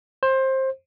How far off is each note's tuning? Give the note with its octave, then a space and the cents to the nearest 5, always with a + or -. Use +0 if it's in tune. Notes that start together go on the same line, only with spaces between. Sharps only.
C5 +20